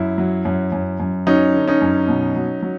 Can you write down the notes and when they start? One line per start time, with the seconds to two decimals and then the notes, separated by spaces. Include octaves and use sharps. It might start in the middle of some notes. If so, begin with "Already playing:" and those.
Already playing: F#2 E4
0.18 F#3
0.45 F#2
0.72 F#2
1.00 F#2
1.27 F#3 C#4 D#4
1.54 D3
1.68 C#4 D#4
1.82 F#2
2.08 B2
2.36 F#3
2.63 F#3